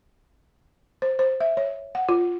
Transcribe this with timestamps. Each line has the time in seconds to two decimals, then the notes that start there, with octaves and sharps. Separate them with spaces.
1.02 C5
1.19 C5
1.41 E5
1.57 C#5
1.95 F#5
2.09 F4